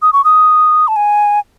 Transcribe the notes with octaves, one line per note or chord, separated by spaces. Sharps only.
D#6
C#6
D#6
A5
G#5